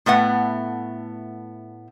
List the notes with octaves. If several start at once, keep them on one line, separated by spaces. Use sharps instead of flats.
A2 A3 B3 F#5